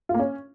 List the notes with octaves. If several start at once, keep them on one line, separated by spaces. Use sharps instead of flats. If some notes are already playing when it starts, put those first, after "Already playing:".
F4
A#3
C#4